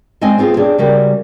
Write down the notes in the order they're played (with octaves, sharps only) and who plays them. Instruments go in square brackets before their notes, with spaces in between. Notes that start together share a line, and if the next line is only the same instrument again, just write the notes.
[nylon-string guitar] G#3 C4 C#4 D#5 G#5
B3 C4 F4 F#4 G#4
C4 D4 G#4 C#5 D5
C#3 G3 C#4 F#4 A#4